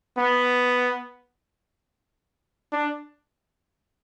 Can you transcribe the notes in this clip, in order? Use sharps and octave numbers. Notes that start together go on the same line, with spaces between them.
B3
D4